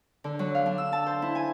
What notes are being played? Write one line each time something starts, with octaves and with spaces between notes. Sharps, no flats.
D3
F#3
F5
D4
E6
A5
C5
E4
G#5